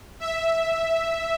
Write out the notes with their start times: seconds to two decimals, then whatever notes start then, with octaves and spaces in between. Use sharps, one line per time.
0.20 E5